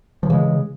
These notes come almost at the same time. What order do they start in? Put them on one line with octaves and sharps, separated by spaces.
F3 E3 C#3 G#3